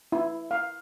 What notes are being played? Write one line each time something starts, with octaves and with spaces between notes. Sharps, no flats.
E4
F5